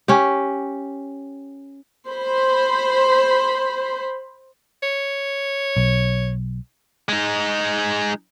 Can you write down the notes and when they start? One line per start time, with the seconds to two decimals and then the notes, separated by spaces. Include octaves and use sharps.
0.08 C#4 G4
2.08 C5 B5
4.83 C#5
5.77 B1
7.09 G#3 D#4